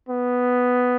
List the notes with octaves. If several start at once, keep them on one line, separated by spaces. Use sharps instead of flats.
B3